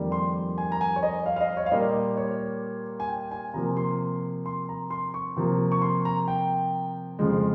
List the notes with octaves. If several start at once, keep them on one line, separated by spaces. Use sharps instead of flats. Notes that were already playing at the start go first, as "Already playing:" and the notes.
Already playing: F2 D#3 G3 A#3
C6
G#5
A#5
G#5
C#5
D#5
F5
F5
D#5
C#5
F5
A#2 G3 A#3 D#5
C#5
G#5
G5
G#5
C3 F3 A#3 A#5
C6
C6
A#5
C6
C#6
C3 F3 A#3
C#6
C6
A#5
G5
F2 C#3 F3 G#3